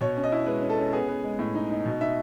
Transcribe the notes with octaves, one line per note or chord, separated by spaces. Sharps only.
B2 C#5
C#4
D#5
E4
G#3 B4
C#4
A4
C#4
B3 G#4
B3
G#3
A2
D#4
D#4
B2
D#4 E5